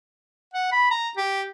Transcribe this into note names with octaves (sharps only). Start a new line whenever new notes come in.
F#5
B5
A#5
G4